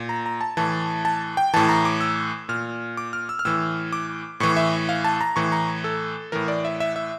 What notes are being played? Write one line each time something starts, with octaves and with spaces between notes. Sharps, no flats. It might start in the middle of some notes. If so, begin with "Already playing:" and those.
Already playing: A#2
A#5
A#5
A5
A2 E3 A5
A5
G5
A2 E3 A5
A#5
D6
E6
A#2 F6
D6
F6
E6
F6
A2 E3 E6
D6
A2 E3 C#6
E5
F5
A5
A#5
A2 E3 C#6
A#5
A4
A2 E3 A#4
D5
E5
E5
E5